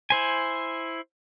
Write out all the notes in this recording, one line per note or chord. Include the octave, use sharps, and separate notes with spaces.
E4 C5 G#5